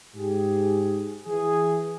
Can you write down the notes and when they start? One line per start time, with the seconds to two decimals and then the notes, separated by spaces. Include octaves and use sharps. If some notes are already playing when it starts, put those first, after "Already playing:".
0.15 G#2 G4 G#4
1.27 E3 G#4